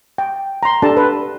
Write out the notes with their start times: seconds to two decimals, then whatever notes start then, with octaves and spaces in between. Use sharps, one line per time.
0.18 G5
0.63 A#5 C6
0.82 D4 G4 A4 D5 A5
0.97 B4